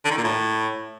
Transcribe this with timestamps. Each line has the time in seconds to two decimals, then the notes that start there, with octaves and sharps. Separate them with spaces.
0.05 D3
0.11 D#3
0.18 A#2
0.24 A2